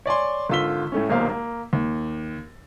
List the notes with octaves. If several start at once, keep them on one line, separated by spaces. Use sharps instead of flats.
C#5 D5 G#5 C6
G#1 D3 F4 E6 B6 G7
A2 A3 C#4
D#1 B1 A#3 C5 F5
A#3
D#2